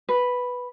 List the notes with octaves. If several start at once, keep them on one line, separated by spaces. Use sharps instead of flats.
B4